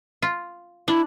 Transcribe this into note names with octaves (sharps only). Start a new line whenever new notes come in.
F4
D4 E4